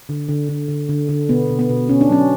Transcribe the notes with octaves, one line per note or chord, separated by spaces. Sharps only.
D3
D3
D3
D3
D3
D3
B2 B3
B2
B3
B2
B2 C#4
D4
F#3 C#4